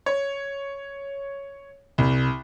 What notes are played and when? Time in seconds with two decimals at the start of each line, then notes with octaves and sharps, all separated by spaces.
0.06 C#5
1.98 C2